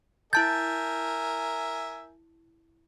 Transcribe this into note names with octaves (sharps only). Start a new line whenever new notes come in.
E4 A#4 E5 G#5 A5 G6 A6